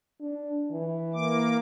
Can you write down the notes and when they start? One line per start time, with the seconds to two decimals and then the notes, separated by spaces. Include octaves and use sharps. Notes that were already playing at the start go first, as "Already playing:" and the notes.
0.21 D4
0.71 E3
1.14 A#3 D6